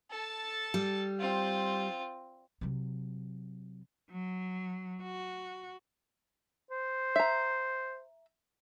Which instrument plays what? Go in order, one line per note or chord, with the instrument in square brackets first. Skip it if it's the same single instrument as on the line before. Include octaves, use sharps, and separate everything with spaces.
[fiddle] A4 A5
[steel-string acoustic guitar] G3
[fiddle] C4 F4
[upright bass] C3 F#3
[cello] F#3
F#4
[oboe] C5
[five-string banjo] E5 A#5